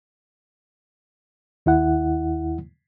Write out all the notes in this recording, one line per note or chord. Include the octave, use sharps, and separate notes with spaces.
D#2 E4 F#5